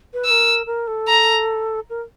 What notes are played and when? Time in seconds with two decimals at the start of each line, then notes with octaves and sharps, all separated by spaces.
0.13 B4
0.25 B4 E6
0.30 A#4
0.66 A#4
0.87 A4
1.08 A#5
1.90 A#4